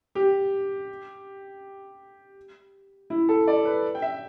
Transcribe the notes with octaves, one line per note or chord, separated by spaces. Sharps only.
G4
E4
A4
D5
B4
G5
E5